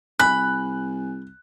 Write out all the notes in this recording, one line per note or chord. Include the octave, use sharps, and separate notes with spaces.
C2 G#5 B5 F#6